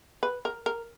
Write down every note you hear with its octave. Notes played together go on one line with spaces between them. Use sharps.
B4
A#4
A#4